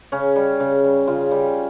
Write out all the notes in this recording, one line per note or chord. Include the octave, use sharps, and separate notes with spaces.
C#3 C#4
G3
C#3
G3
C#3 F4
G3